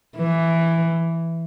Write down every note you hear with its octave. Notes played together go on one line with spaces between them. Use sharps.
E3